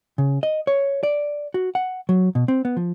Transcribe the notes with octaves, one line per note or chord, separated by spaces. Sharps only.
C#3
D#5
C#5
D5
F#4
F#5
F#3
B2
C4
B3
F3